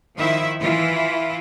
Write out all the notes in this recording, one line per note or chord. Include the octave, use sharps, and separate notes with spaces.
D#3 F3 E4 E5
E3 E4 F4